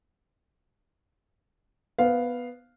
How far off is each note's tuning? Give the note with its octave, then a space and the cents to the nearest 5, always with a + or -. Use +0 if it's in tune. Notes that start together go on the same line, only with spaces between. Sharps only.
B3 +0 C5 -20 F5 +0